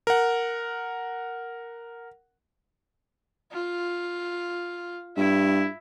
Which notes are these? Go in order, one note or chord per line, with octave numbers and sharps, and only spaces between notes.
A#4 F#5
F4
G2 E4